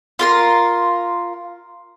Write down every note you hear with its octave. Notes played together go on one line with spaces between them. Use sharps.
F4 A#4 C6